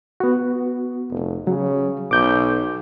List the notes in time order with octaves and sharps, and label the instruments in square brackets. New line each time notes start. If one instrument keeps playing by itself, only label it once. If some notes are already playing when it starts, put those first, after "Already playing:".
[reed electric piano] B3 F#4
[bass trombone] F1
[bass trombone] C#3 [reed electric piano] F#3
[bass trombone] B1 [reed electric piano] D6 G6